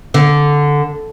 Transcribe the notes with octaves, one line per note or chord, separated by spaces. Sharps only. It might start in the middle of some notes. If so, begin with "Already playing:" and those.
D3